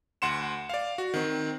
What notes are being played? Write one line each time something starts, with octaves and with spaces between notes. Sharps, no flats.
D2 F#5 C6 C#7 E7
D5 F5
F#4
D#3 C4